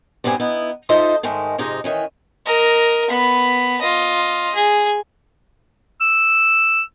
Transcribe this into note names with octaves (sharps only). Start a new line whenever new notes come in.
G2 C3 B3 C4 G#5
B3 D#4 E4
D#4 F4 A4 C5 D#5 E5
G#2 D#3 G#3 A3
F2 G#2 C3 G#3 D#4
D#3 E3 C#4
A#4 D#5
B3 B5
F4 D#5
G#4
E6